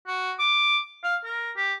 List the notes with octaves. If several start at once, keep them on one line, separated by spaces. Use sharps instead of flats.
F#4
D6
F5
A#4
G4